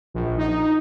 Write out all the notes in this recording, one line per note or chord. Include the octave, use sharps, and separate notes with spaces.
A#1
D#4